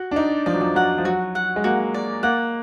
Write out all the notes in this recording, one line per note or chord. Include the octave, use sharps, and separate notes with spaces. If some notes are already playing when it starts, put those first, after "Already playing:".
Already playing: F#4
D4
D#4 D5
F3 D5
F#3
F3
F#3 F#5
F3
F#3 F#4
F#5
G#3
A#3 F#4
D5
A#3 F#5